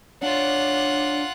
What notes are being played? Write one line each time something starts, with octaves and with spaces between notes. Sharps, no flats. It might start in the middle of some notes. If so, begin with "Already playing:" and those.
D4 F4 C#5 F#5